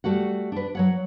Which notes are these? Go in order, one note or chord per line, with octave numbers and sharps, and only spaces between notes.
G3 A3 F#4 F#5
D4 B4
F#3 C#5 F#5